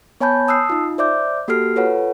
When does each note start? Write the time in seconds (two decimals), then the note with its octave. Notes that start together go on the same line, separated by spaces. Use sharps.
0.21 B3 C#5 G#5 A5 B5 G6
0.48 A5 D#6 E6 F#6 C7
0.70 D#4 F4
0.98 C5 D5 E5 D6 G6
1.48 A#3 F#4 G4 A4 F6 C7
1.76 F4 A4 B4 C#5 F#5